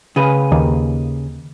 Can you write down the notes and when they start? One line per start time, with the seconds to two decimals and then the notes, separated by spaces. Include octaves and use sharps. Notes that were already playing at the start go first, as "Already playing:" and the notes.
0.16 C#3 G#4 B4
0.52 D#2